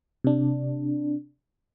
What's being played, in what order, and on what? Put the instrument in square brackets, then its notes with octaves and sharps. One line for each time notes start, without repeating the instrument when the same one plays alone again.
[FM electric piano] C3 D4